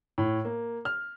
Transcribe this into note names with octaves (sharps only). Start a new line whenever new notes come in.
A2
A#3
F6